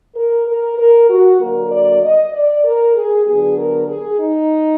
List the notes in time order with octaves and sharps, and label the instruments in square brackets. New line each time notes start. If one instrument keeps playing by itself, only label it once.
[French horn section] A#4
A#4
A#4
F#4
D3 F#3 A#3 A#4
D5
D#5
D5
A#4
G#4
D3 F#3 B3 G#4
A#4
G#4
D#4